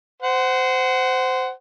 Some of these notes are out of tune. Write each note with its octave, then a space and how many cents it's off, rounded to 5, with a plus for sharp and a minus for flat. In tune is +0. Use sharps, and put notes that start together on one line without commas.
C5 -20 F#5 +15